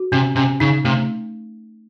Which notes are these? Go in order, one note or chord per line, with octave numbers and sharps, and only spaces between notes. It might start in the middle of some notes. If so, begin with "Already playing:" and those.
Already playing: F#4
C3 C#4
C3 C#4
C#3 D#4
C3 A3